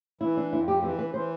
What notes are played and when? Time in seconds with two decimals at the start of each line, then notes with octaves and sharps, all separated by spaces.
0.21 E3 E4
0.37 D4
0.52 F2 E4
0.68 G4
0.83 E3 G4
0.99 B4
1.14 E3 C5